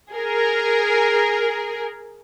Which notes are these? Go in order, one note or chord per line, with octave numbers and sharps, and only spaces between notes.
G#4 A#4